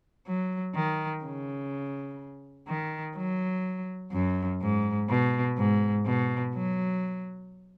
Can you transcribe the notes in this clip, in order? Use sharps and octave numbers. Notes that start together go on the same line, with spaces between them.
F#3
D#3
C#3
D#3
F#3
F#2
G#2
B2
G#2
B2
F#3